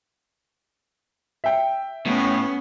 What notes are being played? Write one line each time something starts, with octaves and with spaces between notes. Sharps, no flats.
E5 G5
A2 B3 C#4